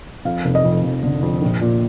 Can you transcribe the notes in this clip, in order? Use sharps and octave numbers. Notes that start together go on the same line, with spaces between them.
F2 F5
F1
D#5
F2
F1
D3
F2
A#1
A#2